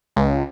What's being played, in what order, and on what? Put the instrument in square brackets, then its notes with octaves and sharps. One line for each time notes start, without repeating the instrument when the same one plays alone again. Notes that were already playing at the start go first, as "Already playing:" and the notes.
[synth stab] C#2